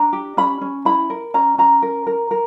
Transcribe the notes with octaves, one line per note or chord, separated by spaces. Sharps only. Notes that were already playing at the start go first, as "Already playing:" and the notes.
Already playing: D4 A#5
G4
C#4 B5
C#4
E4 B5
A#4
C#4 A#5
C#4 A#5
A#4
A#4
A#4